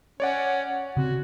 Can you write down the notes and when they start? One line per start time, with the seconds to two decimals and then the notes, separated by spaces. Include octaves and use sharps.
0.20 C#4 C#5 D5 F#5
0.97 C#3 C4 F#4